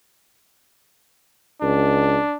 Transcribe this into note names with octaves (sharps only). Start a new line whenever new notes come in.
C#2 D4